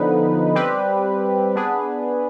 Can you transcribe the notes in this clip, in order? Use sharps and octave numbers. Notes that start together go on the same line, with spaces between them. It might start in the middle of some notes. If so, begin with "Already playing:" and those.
Already playing: D3 F3 B3 D#4 B4
G3 C4 G4 B4
B3 D4 G#4 B4